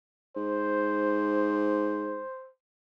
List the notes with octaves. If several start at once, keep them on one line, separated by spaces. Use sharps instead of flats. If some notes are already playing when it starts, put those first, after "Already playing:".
G#2 C5